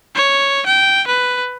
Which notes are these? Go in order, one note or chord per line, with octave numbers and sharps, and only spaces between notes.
C#5
G5
B4